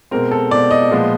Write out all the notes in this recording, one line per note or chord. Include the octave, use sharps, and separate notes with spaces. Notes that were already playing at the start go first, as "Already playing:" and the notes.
B2 G#3 C4 A#4
A4
B2 G#3 C4 D5
D#5
A#2 F3 G#3 B3